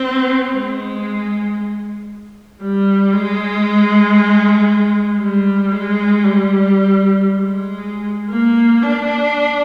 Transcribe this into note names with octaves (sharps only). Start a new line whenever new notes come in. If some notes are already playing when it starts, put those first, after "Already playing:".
Already playing: C4
G#3
G3
G#3
G3
G#3
G3
G#3
A#3
D4